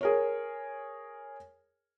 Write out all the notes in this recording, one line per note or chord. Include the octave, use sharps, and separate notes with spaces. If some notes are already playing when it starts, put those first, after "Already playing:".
G#4 A#4 C#5